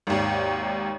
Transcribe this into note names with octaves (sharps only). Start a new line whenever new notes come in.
G#1 D#2